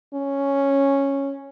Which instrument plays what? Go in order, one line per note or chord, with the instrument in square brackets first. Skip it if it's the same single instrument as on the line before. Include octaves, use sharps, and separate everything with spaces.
[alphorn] C#4